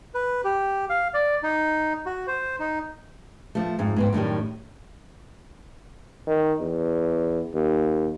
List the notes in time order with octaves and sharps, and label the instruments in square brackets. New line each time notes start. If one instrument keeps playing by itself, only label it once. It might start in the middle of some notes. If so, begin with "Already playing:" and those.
[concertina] B4
G4
F5
D5
D#4
F#4
C5
D#4
[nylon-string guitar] F3 A3
F2 G#2
G#2 B3 C4
F#2 A2 D#3 G3
[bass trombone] D#3
E2
D#2